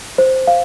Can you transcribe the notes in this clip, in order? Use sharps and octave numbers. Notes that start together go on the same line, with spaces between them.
C5
F5